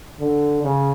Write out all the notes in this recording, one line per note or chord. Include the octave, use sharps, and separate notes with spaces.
D3
C#3